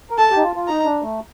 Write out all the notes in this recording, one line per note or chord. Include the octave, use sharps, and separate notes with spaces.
A#4
A4 A5
G4
D#4
F4
F4
D#4 A#5
D4
A3